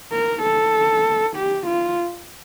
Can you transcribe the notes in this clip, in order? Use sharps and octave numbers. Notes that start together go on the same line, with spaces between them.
A#4
A4
G4
F4